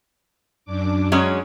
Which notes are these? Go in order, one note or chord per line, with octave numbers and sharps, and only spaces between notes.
F#2 D4 D6
F#3 G#3 C#4